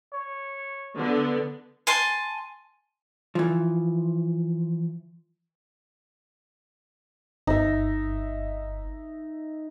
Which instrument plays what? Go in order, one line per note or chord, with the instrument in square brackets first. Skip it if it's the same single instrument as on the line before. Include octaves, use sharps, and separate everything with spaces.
[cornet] C#5
[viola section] D3 B3
[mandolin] G#5 A5 C6
[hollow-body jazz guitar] E3 F3
[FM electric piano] G1 [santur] D#4 E5